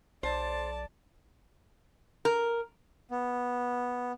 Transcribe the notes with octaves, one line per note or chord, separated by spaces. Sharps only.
B1 C5 D5 A5
A#4
B3